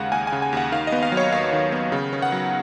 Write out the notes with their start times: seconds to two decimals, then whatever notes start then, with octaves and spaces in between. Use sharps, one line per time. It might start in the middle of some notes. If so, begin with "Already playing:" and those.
Already playing: D#2 C#3 G#3 F5 F#5
0.12 D#2 G#5
0.27 G#5
0.32 C#3
0.42 G#5
0.53 D#2 F#5
0.72 D#3 F5
0.87 D#5
0.92 B3
1.03 F5
1.12 F#3
1.17 C#5
1.32 D#2 F5
1.53 D#3
1.72 B3
1.92 C#3
2.13 C#4
2.22 F#5
2.32 F#3